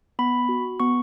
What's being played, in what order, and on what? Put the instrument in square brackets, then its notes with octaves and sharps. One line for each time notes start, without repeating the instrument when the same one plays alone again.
[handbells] B3 B5
F#4
B3 C#6